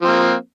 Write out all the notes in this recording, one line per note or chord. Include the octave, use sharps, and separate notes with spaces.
F3 A#3 C4